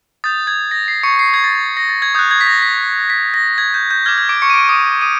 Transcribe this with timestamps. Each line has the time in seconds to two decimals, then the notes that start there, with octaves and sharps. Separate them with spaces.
0.24 D#6 G6 A6
0.47 G#6
0.71 A#6
0.88 C7
1.03 C#6 C#7
1.19 C7
1.34 G#6
1.44 A6
1.77 A#6
1.89 A6
2.02 G#6
2.15 D#6 F#6 G6
2.31 G#6
2.41 B6
2.47 A#6
2.62 B6
3.10 B6
3.34 A#6
3.58 G#6
3.74 G6
3.91 G6
4.06 D6 F6 G#6
4.18 G#6
4.29 D6 D7
4.42 C#6 C#7
4.50 D#7
4.53 D6 D7
4.69 D#6 D#7
5.01 D#6 D#7